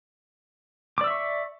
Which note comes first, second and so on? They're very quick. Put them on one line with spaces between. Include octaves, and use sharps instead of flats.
D6 D5 E6 E5 C#6